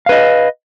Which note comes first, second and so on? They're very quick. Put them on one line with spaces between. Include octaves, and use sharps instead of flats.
F5 B4 D#5